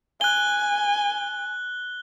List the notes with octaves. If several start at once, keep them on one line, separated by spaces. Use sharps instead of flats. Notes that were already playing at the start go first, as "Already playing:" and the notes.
G#5 F#6 G7